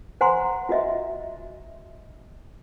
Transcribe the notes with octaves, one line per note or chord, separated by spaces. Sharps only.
C5 F#5 G#5 A#5 C6
F4 F#4 D#5 E5